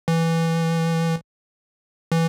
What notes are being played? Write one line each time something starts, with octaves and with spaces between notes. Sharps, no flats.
E3
E3